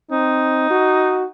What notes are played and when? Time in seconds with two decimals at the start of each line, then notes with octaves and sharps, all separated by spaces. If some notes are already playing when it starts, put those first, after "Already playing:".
0.11 C4 D#4
0.71 F#4